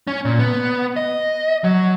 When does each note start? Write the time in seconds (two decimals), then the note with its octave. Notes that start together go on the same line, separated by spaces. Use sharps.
0.07 C#4
0.25 A#2
0.39 B3
0.96 D#5
1.64 F#3